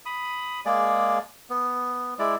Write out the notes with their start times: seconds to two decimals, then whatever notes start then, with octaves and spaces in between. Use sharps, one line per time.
0.06 B5 D#6
0.66 G#3 A#3 G#4 D5
1.50 B3
2.19 G#3 E4 D5